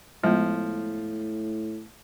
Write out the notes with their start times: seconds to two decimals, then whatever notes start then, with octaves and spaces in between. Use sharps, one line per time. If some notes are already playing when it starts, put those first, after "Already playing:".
0.23 A2 F3 G#3 B3